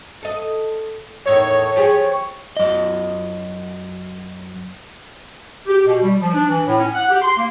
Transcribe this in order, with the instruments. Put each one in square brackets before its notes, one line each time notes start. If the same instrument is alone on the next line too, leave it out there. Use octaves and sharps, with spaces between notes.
[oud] A4 D#5
[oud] E2 A2 D#3 [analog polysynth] C#5
[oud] F3 G4 G#4
[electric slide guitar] F#2 D#5
[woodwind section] G4
B2
G3
F3
D4
E3
A2
C#4
F#5
G4
C6
A#3